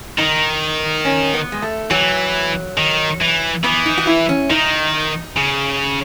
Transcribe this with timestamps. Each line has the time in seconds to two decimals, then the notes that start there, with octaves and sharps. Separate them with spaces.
0.18 D#3 D#4
1.05 C#4
1.34 B3
1.52 G#3
1.62 A3
1.91 E3 F#3
2.78 D#3
3.21 E3
3.64 E3 B3
3.86 D#4
3.98 F#4
4.07 E4
4.29 C#4
4.50 D#3 D#4
5.36 C#3